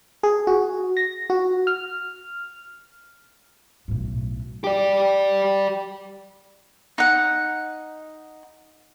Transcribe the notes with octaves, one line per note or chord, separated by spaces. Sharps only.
G#4
F#4
A#6
F#4
F6
B1 A2
G4 D5
D#4 F#5